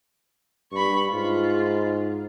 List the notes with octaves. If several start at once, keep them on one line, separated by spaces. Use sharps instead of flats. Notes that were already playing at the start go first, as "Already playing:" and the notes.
G2 B5 C#6
G#2 F4